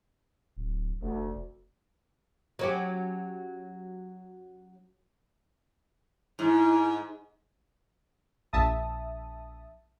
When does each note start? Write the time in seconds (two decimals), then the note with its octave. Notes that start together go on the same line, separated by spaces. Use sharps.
0.57 D1
1.02 F1 D2
2.59 F#3 C#4 G4
6.39 G#2 E4
8.53 A#1 E5 A5 D#6